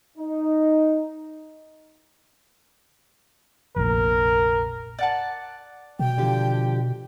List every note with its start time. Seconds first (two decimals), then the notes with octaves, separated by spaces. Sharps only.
0.18 D#4
3.76 F1 A#1 A#4
4.99 D5 F#5 A5
5.99 B2 G5
6.18 D3 F3 G4